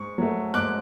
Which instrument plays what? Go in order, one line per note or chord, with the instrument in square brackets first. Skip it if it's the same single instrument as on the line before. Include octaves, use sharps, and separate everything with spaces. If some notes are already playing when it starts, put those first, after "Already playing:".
Already playing: [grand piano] G#2 C#6
F#3 A3
G#2 D6 F#6